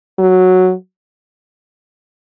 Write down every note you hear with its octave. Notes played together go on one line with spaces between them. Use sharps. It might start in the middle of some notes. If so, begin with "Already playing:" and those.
F#3